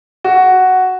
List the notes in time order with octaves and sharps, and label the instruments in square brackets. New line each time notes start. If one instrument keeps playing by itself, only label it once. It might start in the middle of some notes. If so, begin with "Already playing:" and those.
[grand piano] F#4